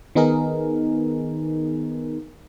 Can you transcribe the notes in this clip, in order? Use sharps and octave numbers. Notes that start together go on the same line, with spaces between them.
D#3 B3 D#4 G#4 A#4